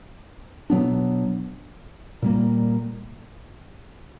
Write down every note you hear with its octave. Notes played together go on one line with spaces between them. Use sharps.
B2 F#3 B3 D4
A#2 G3 A#3